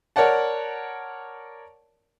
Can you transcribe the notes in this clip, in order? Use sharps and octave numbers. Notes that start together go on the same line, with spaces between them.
A#4 C#5 D5 F#5 A5